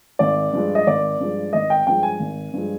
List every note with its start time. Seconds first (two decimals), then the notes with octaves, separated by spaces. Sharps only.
0.19 G#1 D5
0.53 G2 F3 G#3
0.75 D#5
0.87 G#1 D5
1.20 G2 F3 G#3
1.53 G#1 D#5
1.70 G5
1.87 G2 F3 G#3 G5
2.03 G#5
2.20 G#1
2.53 G2 F3 G#3